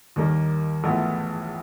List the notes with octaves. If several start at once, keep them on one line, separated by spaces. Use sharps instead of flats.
D#2 D#3 G3 A#3
A#1 A2 E3 G#3 B3